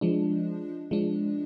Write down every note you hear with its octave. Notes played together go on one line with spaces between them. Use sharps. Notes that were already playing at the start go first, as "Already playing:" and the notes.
F3 G#3 D4
F3 G#3 D4